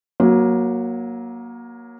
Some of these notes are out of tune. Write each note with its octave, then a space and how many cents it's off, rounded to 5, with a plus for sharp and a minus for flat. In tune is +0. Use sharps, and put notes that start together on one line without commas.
F#3 -5 A#3 +20